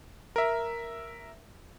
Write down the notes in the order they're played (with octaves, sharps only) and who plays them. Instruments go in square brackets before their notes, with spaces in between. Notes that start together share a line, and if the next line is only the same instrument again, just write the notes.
[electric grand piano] A#4 E5